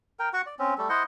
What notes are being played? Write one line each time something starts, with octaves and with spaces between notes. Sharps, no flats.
A#4 G5
F#4 F#5 C#6
D5
C4 C#4
G3 A3 A4
E4 C5 D#5 F#5